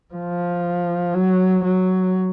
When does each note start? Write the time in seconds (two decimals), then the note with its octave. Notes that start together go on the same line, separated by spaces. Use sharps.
0.14 F3
1.14 F#3
1.64 F#3